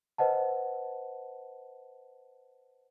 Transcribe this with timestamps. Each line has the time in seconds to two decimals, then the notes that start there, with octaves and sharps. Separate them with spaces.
0.18 B4 C5 D#5 F#5 A5